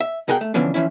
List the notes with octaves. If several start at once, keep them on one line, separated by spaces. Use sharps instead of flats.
E5
B2 G#4 A#4 F#5 G5
A3
D3 E3 F3 B3 C#4 D4
E3 F3 C#4 E4